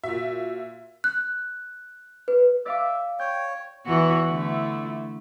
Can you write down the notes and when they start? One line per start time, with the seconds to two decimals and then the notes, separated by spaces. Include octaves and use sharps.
0.04 A#2 F#4 E5
1.04 F#6
2.28 B4
2.66 D5 E5 F5 D6
3.20 C#5 G5 G6
3.86 E2 E3 F#4
4.28 D3 A3 E4